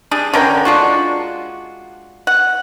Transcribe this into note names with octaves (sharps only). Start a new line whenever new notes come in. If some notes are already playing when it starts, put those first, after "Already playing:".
G3 D4 G#4
D3 C#4 A#4 G5
G#3 D4 F4 F#4
F#5